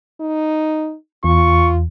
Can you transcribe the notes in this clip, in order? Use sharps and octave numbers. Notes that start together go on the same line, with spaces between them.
D#4
E2 F4 C#6